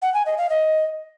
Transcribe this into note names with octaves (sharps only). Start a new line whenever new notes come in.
F#5
G#5
D#5
F5
D#5